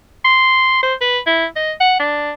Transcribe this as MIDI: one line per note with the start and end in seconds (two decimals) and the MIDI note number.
0.25 0.81 84
0.83 0.94 72
1.01 1.19 71
1.26 1.45 64
1.56 1.72 75
1.80 1.94 78
1.99 2.32 62